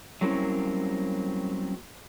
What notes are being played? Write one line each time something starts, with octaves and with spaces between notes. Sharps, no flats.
F#3 G3 A#3 C4 C#4 E4